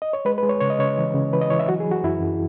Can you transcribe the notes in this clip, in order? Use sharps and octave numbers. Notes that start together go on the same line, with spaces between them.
D#5
C#5
G#3 B4
B4
G#3
C#5
C#3 C#5
D#5
C#3 C#5
E3
C#3
E3 B4
D#5
E3 C#5
E5
F#3 F#4
G#4
F#3
F#4
F#2 E4
F#2